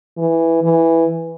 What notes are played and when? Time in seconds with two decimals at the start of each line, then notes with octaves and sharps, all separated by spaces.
0.17 E3
0.63 E3